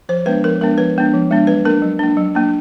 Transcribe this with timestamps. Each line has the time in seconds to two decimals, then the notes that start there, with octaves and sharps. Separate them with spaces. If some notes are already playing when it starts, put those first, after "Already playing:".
0.09 F3 C5
0.26 G#3 B3 D4 B4
0.43 F3 A#4
0.61 G#3 B3 D4 A#4
0.78 F3 B4
0.96 G#3 B3 D4
1.14 F3
1.31 G#3 B3 D4
1.47 F#3 B4
1.65 A#3 D4 A#4
1.82 F#3
1.99 A#3 D4
2.17 F#3
2.35 A#3 D4